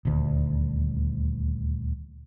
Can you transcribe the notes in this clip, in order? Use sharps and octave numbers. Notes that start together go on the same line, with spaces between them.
D#1 D2